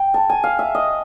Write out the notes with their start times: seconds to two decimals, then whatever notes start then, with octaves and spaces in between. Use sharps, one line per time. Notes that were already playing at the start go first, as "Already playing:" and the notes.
Already playing: G5
0.14 A5
0.29 G#5
0.44 F5
0.59 E5
0.75 D#5